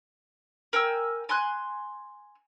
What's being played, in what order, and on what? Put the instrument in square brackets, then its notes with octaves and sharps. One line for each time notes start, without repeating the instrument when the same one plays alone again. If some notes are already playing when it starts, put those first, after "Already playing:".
[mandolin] A#4 G5 G#5 E6
G#5 C6 F#6